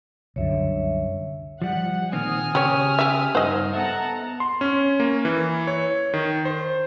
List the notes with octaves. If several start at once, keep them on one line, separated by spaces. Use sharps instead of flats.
C2 F#2 D3 C#5 E5
F3 G3 F#5
A#2 D#3 C4 G#5 D#6 F6
C#3 G4 C#5
G4 E5
G2 D#4 C5 D#5 F#5
B3 A4 E5 F#5 A5 A#5
C6
C#4
A#3
E3
C#5
D#3
C5